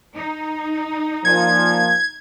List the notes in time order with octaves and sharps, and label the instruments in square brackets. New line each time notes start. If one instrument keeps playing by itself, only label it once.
[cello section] D#4
[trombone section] A#2 F3 [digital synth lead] G#6